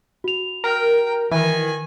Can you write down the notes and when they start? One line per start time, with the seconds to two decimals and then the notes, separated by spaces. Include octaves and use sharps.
0.24 F#4 F7
0.64 A#4 G5
1.31 D#3 E3 G#5